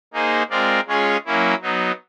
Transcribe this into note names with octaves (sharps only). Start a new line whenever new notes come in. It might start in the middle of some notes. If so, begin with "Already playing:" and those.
A#3 D#4 G#4 C5
G#3 C4 F4 A#4 D5
G#3 C#4 F4 G#4 C#5
F#3 A#3 C#4 E4
F#3 B3 D#4